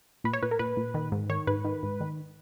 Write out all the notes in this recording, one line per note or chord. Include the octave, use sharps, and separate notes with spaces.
A#2 B4
C#5
A#2 B4
A#4
A#2 B4
A#2
D#3
G#2
D#3 C#5
G#2 B4
D#3
G#2
D#3